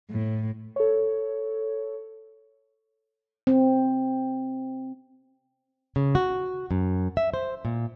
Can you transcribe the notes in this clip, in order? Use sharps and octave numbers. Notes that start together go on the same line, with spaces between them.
A2
A4 C#5
C4
C#3
F#4
F#2
E5
C5
A#2